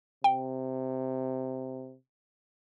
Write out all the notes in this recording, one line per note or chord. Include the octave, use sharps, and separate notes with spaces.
C3 G5